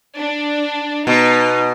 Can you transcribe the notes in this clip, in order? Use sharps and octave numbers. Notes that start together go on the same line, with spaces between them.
D4
B2 D#4